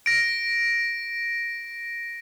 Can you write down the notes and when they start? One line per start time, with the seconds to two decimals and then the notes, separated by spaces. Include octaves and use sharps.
0.06 A#6 D7